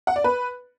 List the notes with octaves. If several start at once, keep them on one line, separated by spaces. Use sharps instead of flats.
F#5
D5
B4